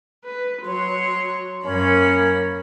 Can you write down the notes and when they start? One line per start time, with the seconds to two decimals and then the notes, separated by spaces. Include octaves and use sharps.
0.24 B4
0.62 F#3 C#5 C6
1.64 F#2 A#3 C#4 B5